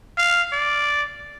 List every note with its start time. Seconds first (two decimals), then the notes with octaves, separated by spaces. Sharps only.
0.18 F5
0.52 D5